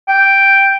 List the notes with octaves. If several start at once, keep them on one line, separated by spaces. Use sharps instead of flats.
G5